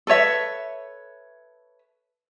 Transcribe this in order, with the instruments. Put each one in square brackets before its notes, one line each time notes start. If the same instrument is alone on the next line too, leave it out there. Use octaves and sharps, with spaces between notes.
[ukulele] A4 B4 C#5 E5